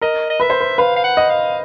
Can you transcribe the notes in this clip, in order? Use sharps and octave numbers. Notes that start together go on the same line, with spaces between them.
A#4 D#5
D#5
B4 E5
C5
B4
B4 F5
F5
F#5
D#5
F5